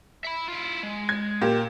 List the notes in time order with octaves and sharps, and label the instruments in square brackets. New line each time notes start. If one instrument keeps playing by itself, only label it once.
[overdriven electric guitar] E5 B5
E4 F4
G#3
[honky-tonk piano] G#6
A#2 G4